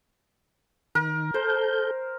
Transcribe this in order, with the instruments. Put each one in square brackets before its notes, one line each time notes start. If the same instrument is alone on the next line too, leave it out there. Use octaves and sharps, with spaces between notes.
[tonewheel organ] D#3 [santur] A#4
[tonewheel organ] A4 G6 [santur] C5